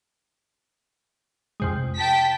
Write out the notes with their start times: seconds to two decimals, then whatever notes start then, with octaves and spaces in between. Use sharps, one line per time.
1.60 F2 C3 G#3
1.96 G5 A5 B6